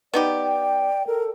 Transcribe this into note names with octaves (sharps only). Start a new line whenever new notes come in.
B3 D#4 G4 D5
G5
A4 A#4